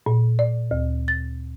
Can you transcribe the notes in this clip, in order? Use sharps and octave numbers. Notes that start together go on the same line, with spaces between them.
A#2
D5
D2
A6